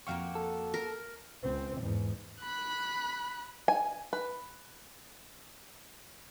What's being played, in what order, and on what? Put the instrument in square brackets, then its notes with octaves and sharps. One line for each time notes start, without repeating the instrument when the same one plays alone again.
[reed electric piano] F2 F5 C#6 [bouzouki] A#3 F#4 G5
[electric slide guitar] A4
[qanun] A#4
[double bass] C#2 C4
E2 G#2
[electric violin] B5 F#6
[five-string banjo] G#5
B4